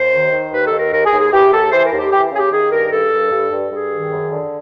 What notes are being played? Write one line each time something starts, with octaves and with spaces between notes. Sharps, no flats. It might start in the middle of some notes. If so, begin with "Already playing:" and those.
Already playing: D#2 C5
D#3
D#3
D#2 B4
A4
D#3
A#4
D#2 A#4
G#4
D#2
G#4
E3 G4
D#2 A4
E3 C5
A#4
D#2
G4
E3 G4
C#3 G#4
G4
D#3 G#4
G2 A#4
G2 A4
G2
G2
G2
G2 G#4
D#3
F#2
D3